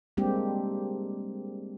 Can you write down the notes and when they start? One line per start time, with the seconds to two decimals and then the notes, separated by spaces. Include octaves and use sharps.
0.17 G3 G#3 A#3 C4 D4 G4